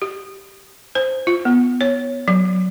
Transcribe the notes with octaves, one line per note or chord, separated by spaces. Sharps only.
G4
C5
F4
B3
C#5
F#3